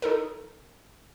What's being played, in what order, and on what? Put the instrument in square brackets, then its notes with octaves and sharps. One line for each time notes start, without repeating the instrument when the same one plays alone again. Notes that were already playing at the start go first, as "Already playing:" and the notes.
[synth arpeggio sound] D#4 A4 A#4